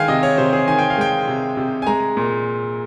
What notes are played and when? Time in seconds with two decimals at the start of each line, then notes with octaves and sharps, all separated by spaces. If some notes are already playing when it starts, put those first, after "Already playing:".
Already playing: D#3 G#3 F5 G5 G#5
0.08 C3 D#5
0.23 C#5
0.38 C3 C5
0.53 G#4
0.68 D#3 G#5
0.79 G5
0.90 F5
0.98 G#3 G5
1.28 C3
1.57 C3
1.82 G#5
1.87 G#3 A#5
2.17 A#2